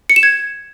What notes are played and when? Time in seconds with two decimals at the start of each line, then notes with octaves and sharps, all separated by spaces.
0.10 C#7
0.16 E7
0.23 G#6